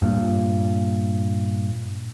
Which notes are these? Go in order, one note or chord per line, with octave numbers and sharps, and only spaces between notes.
G2 A#2